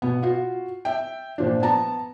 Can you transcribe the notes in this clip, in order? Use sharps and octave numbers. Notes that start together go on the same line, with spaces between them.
B2 B3
F4 F#4
E5 G5
A#2 F3 D4
B3 A5 A#5